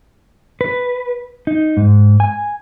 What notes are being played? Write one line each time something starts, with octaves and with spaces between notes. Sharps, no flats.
B4
D#4
G#2
G#5